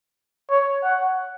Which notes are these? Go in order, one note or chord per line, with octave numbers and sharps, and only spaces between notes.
C#5
F#5